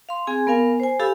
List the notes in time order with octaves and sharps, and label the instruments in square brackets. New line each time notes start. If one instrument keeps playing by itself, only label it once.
[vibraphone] F5 C6
C4 G#4 G#5
B3 A#4 F5 G#5
C5 G#5
G4 A4 F5 G#5 B5 E6